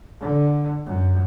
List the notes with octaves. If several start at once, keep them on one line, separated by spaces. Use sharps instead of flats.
D3
F#2